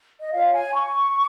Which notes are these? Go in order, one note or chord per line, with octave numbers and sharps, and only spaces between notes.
D#5
F4 C#5 F5
G#5
C#6